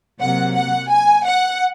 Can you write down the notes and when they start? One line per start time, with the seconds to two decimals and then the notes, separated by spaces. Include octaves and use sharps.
0.21 C3 F#3 A#3 F#5
0.56 F#5
0.91 G#5
1.26 F#5